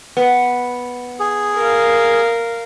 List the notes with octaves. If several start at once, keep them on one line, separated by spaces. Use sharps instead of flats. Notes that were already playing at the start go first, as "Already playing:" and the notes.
B3
G#4
A#4 F5